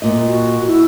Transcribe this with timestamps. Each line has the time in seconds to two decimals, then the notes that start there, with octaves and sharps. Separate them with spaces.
0.02 A#2 D#5
0.28 F#4
0.67 E4